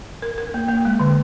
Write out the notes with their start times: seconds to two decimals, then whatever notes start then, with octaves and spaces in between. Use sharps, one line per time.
0.22 A#4
0.38 A#4
0.54 A#3
0.69 A#3
0.85 G#3
1.00 D3